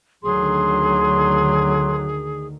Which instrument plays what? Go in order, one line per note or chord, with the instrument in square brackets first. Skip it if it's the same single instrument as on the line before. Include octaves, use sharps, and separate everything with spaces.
[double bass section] D2 D3 D#3 [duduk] F#3 [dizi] G#4 [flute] C6